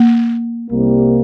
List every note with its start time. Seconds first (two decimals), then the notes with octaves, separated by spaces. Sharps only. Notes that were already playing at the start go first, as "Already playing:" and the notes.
Already playing: A#3
0.70 C2 C3 G3 A#3